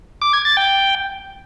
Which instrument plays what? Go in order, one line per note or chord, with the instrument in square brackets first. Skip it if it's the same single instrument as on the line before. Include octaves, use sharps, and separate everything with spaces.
[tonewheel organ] D6
G#6
A6
G5